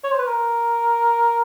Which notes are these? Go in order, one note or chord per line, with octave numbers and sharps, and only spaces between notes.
C#5
C5
B4
A#4